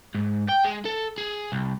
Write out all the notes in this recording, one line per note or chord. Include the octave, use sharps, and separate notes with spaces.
G#2
G5
G#3
A4
G#4
C2